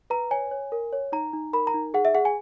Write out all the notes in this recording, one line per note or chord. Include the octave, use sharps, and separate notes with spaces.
B4 A#5
C#5 G#5
C#5
A#4
C#5
D#4 A#5
D#4
A#4 B5
A#5
D#4
G#4 F#5
E5
G#4 F#5
G#5